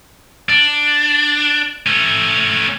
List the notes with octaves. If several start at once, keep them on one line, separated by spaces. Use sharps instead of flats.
D4
A3 C#4